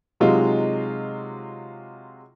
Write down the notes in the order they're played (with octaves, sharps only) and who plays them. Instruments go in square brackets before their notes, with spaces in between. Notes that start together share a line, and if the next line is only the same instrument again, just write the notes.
[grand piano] C3 F#3 G#3 D#4 F4